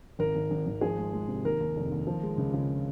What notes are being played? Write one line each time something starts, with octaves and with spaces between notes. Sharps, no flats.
G#1 A#4
G#1
G#1
G#1
F3 G#4
G#3
G#3
C3
D#2 A#4
D#2
F1
D#2
F3
G#3
C#2
C#3